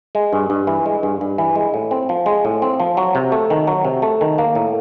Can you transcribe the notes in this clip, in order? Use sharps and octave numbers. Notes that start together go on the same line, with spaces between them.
G#3
G2
G2
E3
G#3
G2
G2
E3
G#3
A2
C4
F3
G#3
A2
C4
F3
F#3
C3
A3
D#3
F#3
C3
A3
D#3
A#3
A2